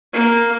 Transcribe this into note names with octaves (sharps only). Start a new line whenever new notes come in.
A#3